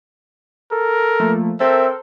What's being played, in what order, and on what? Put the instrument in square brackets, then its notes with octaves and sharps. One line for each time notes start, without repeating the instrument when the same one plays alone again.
[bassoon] A4 [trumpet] A#4
[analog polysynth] F3 A3 A#3
[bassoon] C4 [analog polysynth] A4 A#4 C5 [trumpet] E5